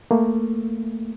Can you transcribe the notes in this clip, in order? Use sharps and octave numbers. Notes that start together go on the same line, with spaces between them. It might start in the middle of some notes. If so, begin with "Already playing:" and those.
A3 A#3